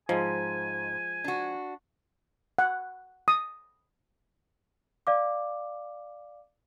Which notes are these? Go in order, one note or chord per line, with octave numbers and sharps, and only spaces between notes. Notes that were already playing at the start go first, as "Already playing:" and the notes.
G#2 F3 G#3 G#5
D4 F#4
F#5
D#6
D5 F5 D6